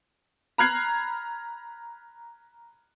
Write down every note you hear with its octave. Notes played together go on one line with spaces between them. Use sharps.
A#5 B5 F6 F#6 G#6 C7